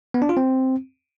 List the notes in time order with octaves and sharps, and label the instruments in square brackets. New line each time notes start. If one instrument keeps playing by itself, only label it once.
[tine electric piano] B3
D4
F4
C4